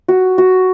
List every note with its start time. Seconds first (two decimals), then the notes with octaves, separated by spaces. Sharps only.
0.08 F#4
0.38 F#4